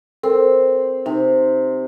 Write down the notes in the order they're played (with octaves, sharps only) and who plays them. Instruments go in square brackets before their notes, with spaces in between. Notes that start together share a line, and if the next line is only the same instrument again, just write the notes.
[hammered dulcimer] C4 [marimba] A4 A#4
[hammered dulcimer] C3 [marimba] D#4